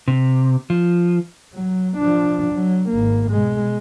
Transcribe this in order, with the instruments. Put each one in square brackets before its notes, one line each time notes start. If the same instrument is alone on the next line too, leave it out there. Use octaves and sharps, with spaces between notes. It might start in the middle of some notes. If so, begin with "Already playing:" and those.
[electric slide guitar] C3
F3
[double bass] F#3
F3 D4
F#3
G#1 A#3
B2 G#3